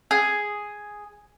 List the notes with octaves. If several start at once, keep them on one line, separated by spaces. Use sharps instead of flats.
G#4